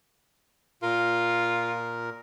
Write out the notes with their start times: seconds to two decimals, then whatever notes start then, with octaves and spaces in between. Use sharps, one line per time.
0.83 A#2 F4 A#4